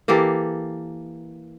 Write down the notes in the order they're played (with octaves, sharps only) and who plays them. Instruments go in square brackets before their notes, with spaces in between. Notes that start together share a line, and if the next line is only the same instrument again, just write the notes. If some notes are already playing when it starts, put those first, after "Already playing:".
[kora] E3 A#3 G4 A4